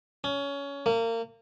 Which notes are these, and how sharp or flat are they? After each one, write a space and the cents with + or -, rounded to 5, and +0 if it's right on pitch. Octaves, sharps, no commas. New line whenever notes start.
C#4 +20
A#3 -30